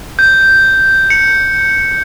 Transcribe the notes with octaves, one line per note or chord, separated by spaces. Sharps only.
G6
C#7